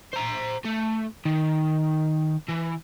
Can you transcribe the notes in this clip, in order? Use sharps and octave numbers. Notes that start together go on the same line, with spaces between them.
C5 A#5
A3
D#3
E3